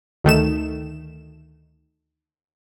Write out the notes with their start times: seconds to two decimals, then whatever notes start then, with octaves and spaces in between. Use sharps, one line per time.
0.24 D2 D#3 A3 E7